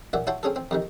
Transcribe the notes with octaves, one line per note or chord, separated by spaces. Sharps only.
F#2 A#2 F#4 D5 E5
E4 F#4 C#5 G5 A5 C6
C4 C#4 G#4 A4
C4
F2 C3 D#3